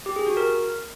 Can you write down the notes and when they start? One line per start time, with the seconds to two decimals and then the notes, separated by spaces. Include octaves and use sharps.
0.06 G4
0.16 G#4
0.27 F#4
0.37 A#4